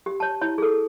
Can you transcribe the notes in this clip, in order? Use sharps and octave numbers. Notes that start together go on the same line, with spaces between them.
G4
C#5 A5
E4 C#5
G#4 A4